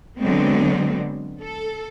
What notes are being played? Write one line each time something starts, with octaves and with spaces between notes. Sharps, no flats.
D3 F#3 G#3 B3 C4
A4